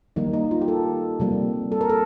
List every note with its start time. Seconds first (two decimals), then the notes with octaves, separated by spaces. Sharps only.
0.16 D#3 G3 A#3 D#4
0.33 D#4
0.51 F4
0.61 G4
0.68 A4
1.20 C3 G3 A#3
1.72 A4
1.81 A#4
1.89 A4